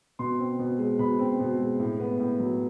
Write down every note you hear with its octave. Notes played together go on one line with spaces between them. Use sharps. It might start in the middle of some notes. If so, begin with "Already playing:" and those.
B2 C6
C4
B2
G#3
B2 B5
C4
B2
G#3
A2
B3
A2
F#3